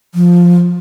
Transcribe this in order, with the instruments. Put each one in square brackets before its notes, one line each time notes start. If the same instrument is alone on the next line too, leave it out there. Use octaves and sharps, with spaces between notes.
[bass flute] F3